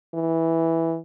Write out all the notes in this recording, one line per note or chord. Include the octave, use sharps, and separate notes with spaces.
E3